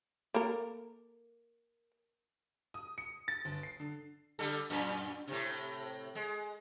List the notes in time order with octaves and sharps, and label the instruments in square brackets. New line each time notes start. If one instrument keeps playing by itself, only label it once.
[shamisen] A#3 A4 A#4
[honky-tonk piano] D#6
C#7
A6
G1
C7
D3
[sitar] D3 G3 A4
F#2 A#2
A2 C3
G#3